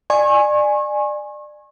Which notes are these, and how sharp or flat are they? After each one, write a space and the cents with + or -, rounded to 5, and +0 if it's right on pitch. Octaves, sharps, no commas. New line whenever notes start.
D5 +30 G#5 +0 C#6 -35